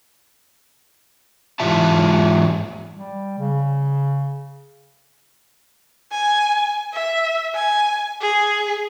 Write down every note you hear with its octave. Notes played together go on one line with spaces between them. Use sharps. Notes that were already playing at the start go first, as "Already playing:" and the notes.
G#2 E3 F4 G4 E5 A5
G3
C#3
G#5
E5
G#5
G#4